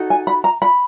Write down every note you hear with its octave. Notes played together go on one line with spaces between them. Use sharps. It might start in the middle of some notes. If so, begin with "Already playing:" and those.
Already playing: D#4 F#4 A4
G#5
B5
A#5
B5